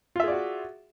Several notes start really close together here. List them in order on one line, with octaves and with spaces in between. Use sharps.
F4 E5 G#4 D5 F#4